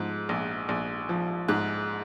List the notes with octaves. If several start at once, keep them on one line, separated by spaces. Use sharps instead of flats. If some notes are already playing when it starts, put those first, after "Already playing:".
Already playing: G#2 F3
A#1
A#1
F3
G#2 F#6